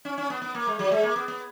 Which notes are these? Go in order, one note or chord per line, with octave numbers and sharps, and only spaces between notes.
C#4
C#4
B3
B3
A#3
G#3
F#3
G#3
A#3
B3
B3